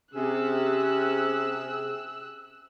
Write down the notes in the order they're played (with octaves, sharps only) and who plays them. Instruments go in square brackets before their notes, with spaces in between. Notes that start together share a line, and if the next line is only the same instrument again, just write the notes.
[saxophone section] C3 G#4 [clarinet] C#4 [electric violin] E6 F#6